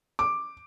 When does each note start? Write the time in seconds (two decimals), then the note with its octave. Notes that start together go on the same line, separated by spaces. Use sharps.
0.19 D6